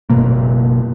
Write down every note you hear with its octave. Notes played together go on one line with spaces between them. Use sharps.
F#1 B2 A#3